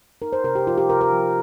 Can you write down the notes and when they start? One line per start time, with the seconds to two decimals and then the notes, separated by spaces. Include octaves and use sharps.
0.22 D#4 A#4
0.33 C5
0.44 C3 A#4
0.55 G4
0.67 F3 F4
0.78 G4
0.90 C3 A#4
1.01 A#4
1.12 F3